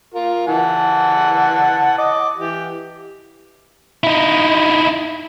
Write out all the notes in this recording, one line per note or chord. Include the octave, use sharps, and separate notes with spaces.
F4 A#4
E3 F#5 A5
D#5 D6
E3 G4
D#4 E4